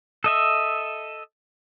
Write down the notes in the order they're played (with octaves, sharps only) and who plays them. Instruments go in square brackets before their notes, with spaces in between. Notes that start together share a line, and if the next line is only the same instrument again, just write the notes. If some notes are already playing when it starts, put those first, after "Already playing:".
[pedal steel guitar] A4 D#5 E5